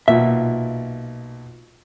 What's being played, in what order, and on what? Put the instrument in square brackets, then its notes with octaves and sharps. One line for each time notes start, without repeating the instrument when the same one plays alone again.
[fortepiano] B1 A#2 [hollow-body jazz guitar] E5